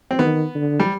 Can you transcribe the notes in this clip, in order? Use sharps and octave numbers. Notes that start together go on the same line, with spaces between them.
C4
D#3 B3
D3
G3